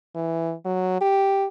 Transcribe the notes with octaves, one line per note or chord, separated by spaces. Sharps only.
E3
F#3
G4